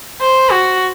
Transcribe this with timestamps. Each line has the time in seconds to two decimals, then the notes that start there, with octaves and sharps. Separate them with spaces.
0.21 C5
0.52 F#4